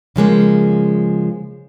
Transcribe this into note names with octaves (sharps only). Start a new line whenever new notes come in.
C#3 F3 G#3 A#3